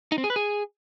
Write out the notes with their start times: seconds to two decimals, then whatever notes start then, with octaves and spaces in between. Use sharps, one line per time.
0.12 D#4
0.18 C4
0.24 G#4
0.30 B4
0.36 G#4